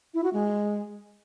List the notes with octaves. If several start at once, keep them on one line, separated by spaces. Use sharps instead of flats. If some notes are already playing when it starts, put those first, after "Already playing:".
E4
F#4
G#3